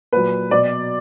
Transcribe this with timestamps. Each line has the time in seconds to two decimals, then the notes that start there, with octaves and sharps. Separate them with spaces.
0.13 A#2 F#3 B4
0.51 B2 F#3 D5